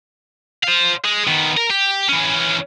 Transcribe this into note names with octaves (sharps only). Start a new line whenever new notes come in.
C5 F5
G#3
D#3 B3
A#4
G4
E3 C#4